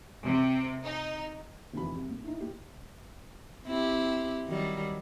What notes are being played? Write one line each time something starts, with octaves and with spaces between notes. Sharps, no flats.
C3
D#4
F1 A#1 D#3 E3 F#4 B5
C2
A#2
D#4 E4
A#2 G4
C4 E4 G4
D#3 F#3 G3